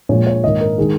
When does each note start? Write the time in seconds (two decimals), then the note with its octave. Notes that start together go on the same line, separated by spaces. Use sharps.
0.09 A#2 F3 G#3 C#5
0.27 C#5
0.44 G#2 D#3 A#3 D#5
0.61 A#4
0.78 D#3 G#3 G#4